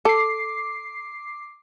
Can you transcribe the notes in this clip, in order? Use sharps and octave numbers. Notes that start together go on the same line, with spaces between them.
A4 D6 C7